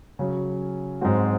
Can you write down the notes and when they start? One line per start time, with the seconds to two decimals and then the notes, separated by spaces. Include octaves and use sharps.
0.19 C#3 F#3 C#4
1.01 G#2 F#3 C4 F#4